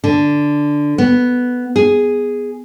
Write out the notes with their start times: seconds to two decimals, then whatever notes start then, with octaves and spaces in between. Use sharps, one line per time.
0.04 D3
0.98 B3
1.76 G#4